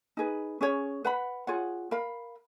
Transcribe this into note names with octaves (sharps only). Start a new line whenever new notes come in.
D#4 G#4 B4
C#4 G#4 C#5
B4 F#5 B5
F4 G#4 C#5 F#5
A#4 F5 B5